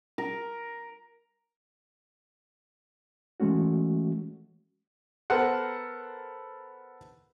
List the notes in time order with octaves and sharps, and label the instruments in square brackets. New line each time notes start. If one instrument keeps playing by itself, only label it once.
[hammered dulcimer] A#4
[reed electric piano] E3 G#3 A3 C#4 F#4
[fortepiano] B3 A4 A#4 C5 F#5